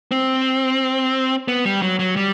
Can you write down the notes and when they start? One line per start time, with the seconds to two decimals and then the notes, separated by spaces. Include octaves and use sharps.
0.11 C4
1.48 B3
1.65 G3
1.82 F#3
1.99 F#3
2.16 G3